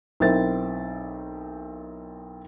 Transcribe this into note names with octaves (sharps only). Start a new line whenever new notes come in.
B1 C4 E4 A#4 E5 A6